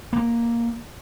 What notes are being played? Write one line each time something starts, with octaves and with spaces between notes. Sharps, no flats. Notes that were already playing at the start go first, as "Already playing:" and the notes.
A#3